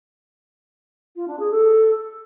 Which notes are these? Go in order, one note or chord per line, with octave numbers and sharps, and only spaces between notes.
F4
D4
G#4
A4